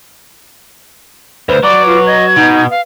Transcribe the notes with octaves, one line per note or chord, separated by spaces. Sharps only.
D2 B4 C5
F#3 D5 D6
F4
D#5 G#6
B2 D#4
F5